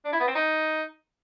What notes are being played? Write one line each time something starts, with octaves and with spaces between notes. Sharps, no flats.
D4
E4
B3
C4
D#4